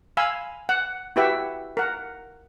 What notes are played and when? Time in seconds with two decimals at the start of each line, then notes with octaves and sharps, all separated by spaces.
0.17 F5 G#5 B5 E6
0.69 F#5
1.16 E4 F#4 G4 B4 E5 F#5
1.77 A#4 F#5